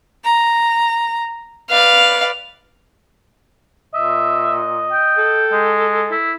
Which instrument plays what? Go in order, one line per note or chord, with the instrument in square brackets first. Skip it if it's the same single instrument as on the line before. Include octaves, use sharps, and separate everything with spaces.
[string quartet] A#5
[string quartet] B4 D5 [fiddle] F5
[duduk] A#2 [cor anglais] D#5 [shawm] E5
[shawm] G5
[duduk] A4
[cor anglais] G#3
[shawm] E4